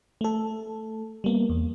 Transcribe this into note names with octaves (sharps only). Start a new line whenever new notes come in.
A3 A4
G3 A#3 B3
E2